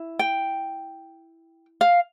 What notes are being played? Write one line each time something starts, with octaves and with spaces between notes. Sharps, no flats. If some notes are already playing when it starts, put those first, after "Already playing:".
Already playing: E4
G5
F5